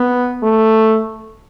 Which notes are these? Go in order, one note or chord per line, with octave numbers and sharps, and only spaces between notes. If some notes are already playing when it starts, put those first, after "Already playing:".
Already playing: B3
A3